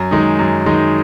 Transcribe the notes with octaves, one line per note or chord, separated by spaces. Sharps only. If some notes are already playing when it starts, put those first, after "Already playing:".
Already playing: F#2
D#3 G#3 D#4
F#2
D#3 G#3 D#4